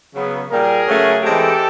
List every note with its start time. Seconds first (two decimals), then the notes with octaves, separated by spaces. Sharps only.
0.13 C#3 F#3 B3
0.50 A#2 G3 A#3 G#4 A#4
0.87 C#3 F#3 A3 C#4
1.23 E3 G#3 C4 G4 A4